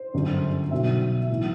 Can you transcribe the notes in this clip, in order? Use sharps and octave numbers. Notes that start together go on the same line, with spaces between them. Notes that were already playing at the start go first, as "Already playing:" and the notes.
Already playing: C5
G1 F#2 D3 G3
B1 B2 F#3 E5
B1 A2 E3